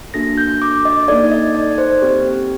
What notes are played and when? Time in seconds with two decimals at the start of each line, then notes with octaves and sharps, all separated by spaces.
0.14 A#3 D4 F#4 A4 A#6
0.38 G6
0.62 D6
0.85 D#5
1.08 A#3 D#4 A4 D5
1.32 D#5
1.55 D5
1.78 C5
2.02 C4 G4